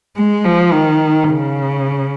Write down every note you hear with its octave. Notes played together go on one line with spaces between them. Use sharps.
G#3
F3
D#3
C#3